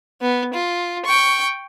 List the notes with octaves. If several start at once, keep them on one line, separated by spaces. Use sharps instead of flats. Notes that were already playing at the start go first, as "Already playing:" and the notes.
B3
F4
G5 C#6